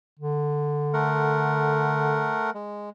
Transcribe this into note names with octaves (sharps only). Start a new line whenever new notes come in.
D3
A3 A#4 F#5
G#3